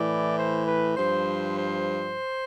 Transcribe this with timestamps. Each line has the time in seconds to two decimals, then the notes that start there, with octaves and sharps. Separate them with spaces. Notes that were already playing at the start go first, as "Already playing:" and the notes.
Already playing: A2 E3 D5
0.37 C5
0.66 B4
0.97 G2 F3 C5
1.58 C5